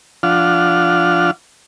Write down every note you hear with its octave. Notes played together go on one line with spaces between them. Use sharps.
F3 D4 F4 F#5 F6